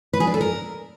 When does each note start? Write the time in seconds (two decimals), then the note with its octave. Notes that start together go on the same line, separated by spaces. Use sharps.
0.13 B4
0.20 G#4
0.27 D4
0.34 A4
0.41 A#4